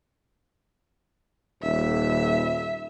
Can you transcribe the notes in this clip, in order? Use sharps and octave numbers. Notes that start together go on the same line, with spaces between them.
D#1 E5